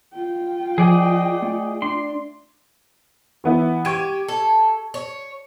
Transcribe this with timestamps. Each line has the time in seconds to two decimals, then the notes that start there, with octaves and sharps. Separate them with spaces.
0.13 F4 G5
0.78 F3 G#4 D5 D#5
1.42 A3
1.82 D4 C6
3.44 E3 B3 E4
3.85 G4 C#6 G#6 D#7
4.28 A4
4.94 C#5